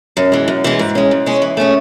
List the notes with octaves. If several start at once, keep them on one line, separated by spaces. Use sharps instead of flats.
F#2
E3 G#3
F#2
E3 G#3
G#2
G#3 C#4
G#2
G#3 C#4
E3
A3 C#4 G#4